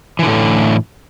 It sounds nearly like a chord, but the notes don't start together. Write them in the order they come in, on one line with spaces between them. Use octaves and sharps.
E3 D3 A2